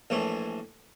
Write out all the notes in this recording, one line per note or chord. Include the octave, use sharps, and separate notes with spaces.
A#1 A2 E3 A3